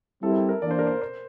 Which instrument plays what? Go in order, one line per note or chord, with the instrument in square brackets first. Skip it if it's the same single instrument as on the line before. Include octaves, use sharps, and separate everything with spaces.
[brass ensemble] G3 C4 E4 G4 [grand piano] A4
[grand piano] A#4
A4
A#4
[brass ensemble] E3 A#3 D4 [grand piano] D5
[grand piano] C5
A#4
C5
C5